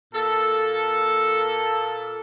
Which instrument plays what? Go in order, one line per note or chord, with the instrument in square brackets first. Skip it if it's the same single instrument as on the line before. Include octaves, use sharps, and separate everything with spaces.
[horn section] A#2 A#3 A4